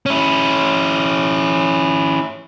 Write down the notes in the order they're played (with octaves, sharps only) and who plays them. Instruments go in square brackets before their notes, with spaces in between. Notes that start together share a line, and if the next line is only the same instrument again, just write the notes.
[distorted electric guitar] C#4 E4